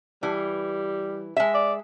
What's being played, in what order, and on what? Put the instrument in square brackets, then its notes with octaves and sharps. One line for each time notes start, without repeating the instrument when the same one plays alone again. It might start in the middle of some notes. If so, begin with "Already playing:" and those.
[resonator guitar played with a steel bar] E3 [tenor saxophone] G3
[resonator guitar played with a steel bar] G#3 E5
[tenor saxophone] D5